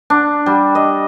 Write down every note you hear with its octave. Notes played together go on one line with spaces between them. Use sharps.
D4
G3
D#5